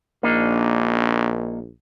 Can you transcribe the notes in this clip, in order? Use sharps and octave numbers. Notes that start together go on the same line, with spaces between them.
A#1 A#3 D4 D#4